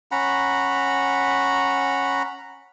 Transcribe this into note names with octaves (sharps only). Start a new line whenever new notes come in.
C#4 F#5 A#5 B5